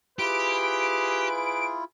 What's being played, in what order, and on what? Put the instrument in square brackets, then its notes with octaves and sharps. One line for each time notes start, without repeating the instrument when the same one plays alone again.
[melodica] E4 F4 [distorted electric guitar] G4 [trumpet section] G#4 B4 [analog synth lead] D7